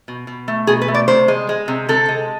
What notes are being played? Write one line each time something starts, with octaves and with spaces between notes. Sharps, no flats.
B2
B2
A3
B2 G#4
B4
A3
D5
C3 C5
G#3
G#3
C3
C3 A4
G#3